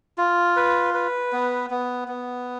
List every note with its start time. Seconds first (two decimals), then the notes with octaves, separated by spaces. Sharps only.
0.18 F4
0.56 B4
0.94 B4
1.33 B3
1.70 B3
2.08 B3